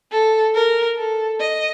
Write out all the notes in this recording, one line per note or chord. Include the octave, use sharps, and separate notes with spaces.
A4
A#4
A4
D#5